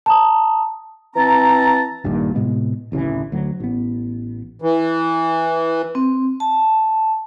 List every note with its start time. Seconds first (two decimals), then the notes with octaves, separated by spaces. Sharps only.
0.06 A5 A#5 D#6
1.16 E3 C4 A5 A#5
2.04 A#1 G2 A#2 D#3
2.35 A2 C3 G#3 B3
2.92 D1 A1 C#3 E3
3.32 D2 F#3
3.60 A1 B3
4.62 E3
5.95 C4
6.40 A5